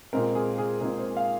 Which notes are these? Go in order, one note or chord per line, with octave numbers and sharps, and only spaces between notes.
A#2 G#3 C4 A#4
G#4
G#4
A#2 G#3 C4 A#4
C5
F5